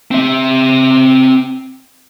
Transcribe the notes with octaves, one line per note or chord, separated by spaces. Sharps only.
C4 E5